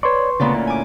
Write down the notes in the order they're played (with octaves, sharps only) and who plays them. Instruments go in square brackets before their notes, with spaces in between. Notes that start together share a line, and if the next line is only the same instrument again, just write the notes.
[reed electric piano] B4 C6 C#6 [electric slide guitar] C#5 D5
[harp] D2 A#2 D5 [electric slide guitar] C#3 B3
[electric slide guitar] C#4 E4
[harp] G#5 D6